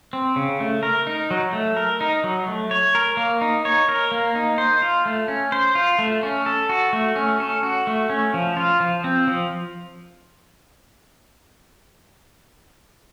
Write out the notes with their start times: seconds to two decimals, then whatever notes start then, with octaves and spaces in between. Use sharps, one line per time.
0.13 C4
0.36 C#3
0.60 A3
0.83 A#4
1.07 D#4
1.31 F#3
1.53 A3
1.77 A#4
2.01 D#4
2.24 F#3
2.48 A3
2.71 C#5
2.95 A#4
3.17 A#3
3.42 D#4
3.65 C#5
3.89 A#4
4.12 A#3
4.35 D#4
4.58 C5
4.82 F4
5.06 A3
5.28 C#4
5.52 C5
5.75 F4
5.99 A3
6.23 C#4
6.46 A4
6.69 F#4
6.93 A3
7.16 C#4
7.40 A4
7.63 F#4
7.87 A3
8.10 C#4
8.34 F3
8.57 F4
8.80 F3
9.04 C4
9.28 F3